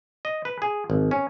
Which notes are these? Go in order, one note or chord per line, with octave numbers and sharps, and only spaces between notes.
D#5
B4
G#4
G#1
C#4